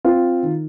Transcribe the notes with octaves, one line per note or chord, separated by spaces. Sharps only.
C4 F4
D#3